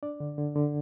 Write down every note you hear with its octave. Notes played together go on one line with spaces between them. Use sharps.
D4 D5
D3
D3
D3